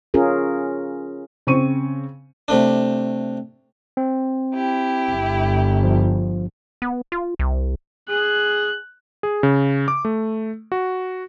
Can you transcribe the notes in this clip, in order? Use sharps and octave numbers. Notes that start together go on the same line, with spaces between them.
C#4 F4 G#4 A#4
C#3 C4 C5 C#6 D#7
C3 A3 D4
C4
E4 G4
G1
F3
B3
F4
C2
G#4 F#6
G#4
C#3
D6
A3
F#4